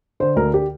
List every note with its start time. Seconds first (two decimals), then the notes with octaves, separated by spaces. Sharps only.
0.20 D3 C5
0.36 D2 A#4
0.54 G4